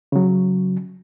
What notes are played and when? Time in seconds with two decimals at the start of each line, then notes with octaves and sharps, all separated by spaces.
0.12 C#3 F#3